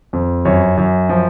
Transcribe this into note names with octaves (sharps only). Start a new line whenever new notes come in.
F2
F#2 C#5
F#2
F3